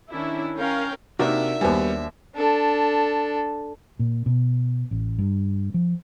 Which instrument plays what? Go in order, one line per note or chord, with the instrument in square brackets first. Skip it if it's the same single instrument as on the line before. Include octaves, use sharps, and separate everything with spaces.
[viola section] D#3 C#4 D4 E4
C#4 A#4 F5 G5
[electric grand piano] C3 [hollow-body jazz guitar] A#3 D4 F#4 [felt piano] D#4 A#4 [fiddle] E5
[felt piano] D#2 C5 G#5 [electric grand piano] G3 B3
[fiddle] D4 A4
[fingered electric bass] A#2
B2
A1
G2
F3